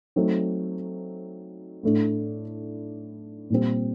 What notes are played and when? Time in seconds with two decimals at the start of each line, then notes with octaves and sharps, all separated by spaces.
0.16 F#3 A3 C4 D#4
1.83 A2 A3 D4
3.50 A#2 G3 C4